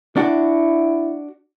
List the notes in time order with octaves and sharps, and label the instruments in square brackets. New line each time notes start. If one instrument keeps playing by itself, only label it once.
[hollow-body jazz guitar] D4 F#4 [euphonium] E4